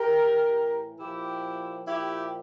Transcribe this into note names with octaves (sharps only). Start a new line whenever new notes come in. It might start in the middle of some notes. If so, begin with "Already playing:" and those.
Already playing: G4 A#4
A2 E3
A#2 F3 E4 G4
A#2 F3 E4 G4